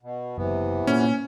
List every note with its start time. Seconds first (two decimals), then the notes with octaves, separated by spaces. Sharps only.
0.02 B2
0.37 F#1 C3 E3 B3
0.87 A#2 C#4